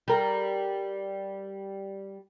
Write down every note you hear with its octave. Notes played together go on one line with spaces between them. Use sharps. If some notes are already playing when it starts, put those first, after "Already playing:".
G3 A#4